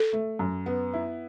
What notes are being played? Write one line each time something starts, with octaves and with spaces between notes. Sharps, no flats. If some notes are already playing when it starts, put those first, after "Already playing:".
Already playing: A4
A3
F#2
B3
E4